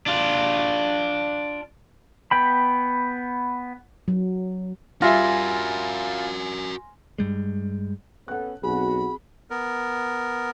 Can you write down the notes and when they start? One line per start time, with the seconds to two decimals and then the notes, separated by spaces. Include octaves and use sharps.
0.06 D4 F4
2.31 B3 G5 B5
4.08 F#3
5.02 G3 F4 F#4 A#4 E5 G#5 C6 A#6
7.18 G2 G3 G#3
8.28 B3 C#4 A4 F#5 F#6
8.63 B1 C4 F#4 G#4 B5
9.51 B3 A#4